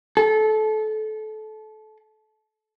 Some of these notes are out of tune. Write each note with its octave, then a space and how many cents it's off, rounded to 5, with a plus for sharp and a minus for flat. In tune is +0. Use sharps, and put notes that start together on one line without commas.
A4 -25